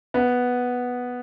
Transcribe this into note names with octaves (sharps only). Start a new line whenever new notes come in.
B3